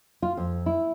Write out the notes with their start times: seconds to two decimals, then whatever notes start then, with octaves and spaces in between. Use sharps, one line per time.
0.22 F4
0.37 F2
0.66 E4